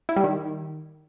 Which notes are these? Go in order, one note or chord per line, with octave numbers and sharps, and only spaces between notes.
E4
G3
D#3